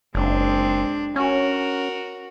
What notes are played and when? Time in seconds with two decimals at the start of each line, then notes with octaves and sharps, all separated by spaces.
0.15 F#1 G#3 C4 D4
1.16 C#4 F#4 A#4